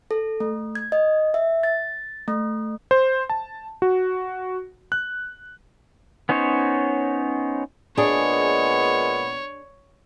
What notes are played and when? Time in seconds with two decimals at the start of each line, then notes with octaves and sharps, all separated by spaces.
0.11 A4
0.40 A3
0.75 G#6
0.92 D#5
1.34 E5
1.63 A6
2.28 A3
2.91 C5
3.30 A5
3.82 F#4
4.92 F#6
6.29 B3 C#4 D#4 C5 C#5
7.97 A#2 G#3 B3 D4 G#4 C#5